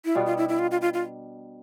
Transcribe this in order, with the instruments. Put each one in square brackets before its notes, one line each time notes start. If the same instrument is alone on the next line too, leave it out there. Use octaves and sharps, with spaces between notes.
[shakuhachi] E4
[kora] B2 G3 B3 D4 [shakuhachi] F4
[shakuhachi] F4
E4
E4
F4
F4
F4
F4